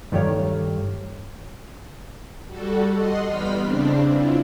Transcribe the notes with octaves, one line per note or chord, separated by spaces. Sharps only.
G2 D#3 A3 G4 C#5 F5
G3 F#4 A4
D#5 F#5 C6
E2 G3 B3 B5 F6 B6
C#3 C4 D4
E4 F4